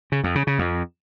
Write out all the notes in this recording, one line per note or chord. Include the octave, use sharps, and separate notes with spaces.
C#3
F2
C#3
C#3
F2